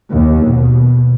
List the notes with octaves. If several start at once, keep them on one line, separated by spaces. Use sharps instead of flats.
D#2
B2